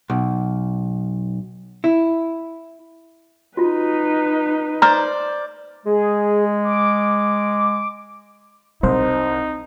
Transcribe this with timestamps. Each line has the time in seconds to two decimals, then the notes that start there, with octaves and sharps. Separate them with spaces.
0.10 B1
1.84 E4
3.57 D#4 F4 F#4 B4
4.82 C5 D5 A#5 F6
5.85 G#3 G#4
6.64 D6
8.83 C2 C4 D#4 C5